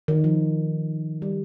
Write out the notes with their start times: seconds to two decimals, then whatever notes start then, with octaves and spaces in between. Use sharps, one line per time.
0.08 D#3
0.24 F3
1.22 G3